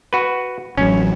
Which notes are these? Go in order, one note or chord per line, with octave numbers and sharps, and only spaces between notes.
F#4 B4
A1 F#3 C#4